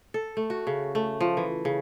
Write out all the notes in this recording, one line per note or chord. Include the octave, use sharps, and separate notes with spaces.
A4
A3
F#4
C#3
A3
F3
E3
C#3